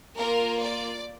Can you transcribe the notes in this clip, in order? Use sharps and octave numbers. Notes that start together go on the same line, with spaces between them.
A#3 F4 A#4
D5